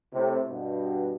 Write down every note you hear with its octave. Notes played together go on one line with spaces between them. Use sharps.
A2 C3
G2 B2